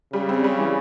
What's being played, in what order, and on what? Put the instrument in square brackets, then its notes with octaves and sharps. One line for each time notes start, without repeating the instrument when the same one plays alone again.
[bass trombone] C#3 [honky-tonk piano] G3
[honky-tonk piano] C4
G3
E3